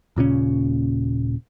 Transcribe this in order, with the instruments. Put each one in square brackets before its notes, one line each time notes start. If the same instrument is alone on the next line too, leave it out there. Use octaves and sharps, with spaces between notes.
[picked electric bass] D#1 A#2 C#3 C#4